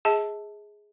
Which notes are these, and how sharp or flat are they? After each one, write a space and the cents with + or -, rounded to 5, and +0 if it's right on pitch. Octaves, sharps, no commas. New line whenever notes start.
G#4 +0 D#5 +45 A5 +0